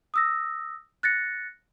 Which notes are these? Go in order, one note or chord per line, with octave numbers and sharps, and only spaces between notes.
D#6 E6 A#6
F#6 A6 A#6 C#7